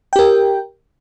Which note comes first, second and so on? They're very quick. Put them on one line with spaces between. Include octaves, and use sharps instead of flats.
G5 G4 A#4